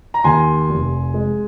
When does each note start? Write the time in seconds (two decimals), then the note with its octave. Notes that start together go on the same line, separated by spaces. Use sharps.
0.14 A#5
0.24 D#2 G#5 C6
0.69 F1
1.14 G#3